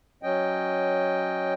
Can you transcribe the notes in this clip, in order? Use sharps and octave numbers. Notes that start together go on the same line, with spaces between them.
F#3 C#4 D#5 G5